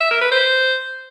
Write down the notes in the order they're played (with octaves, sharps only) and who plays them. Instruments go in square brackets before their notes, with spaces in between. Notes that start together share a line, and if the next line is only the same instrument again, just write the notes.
[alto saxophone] E5
A#4
B4
C5